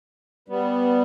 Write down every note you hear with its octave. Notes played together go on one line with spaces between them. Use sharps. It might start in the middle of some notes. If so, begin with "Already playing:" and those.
G3 B3